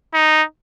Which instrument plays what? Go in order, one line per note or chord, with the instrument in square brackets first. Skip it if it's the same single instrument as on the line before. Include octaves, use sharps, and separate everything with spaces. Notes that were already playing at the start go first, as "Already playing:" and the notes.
[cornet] D#4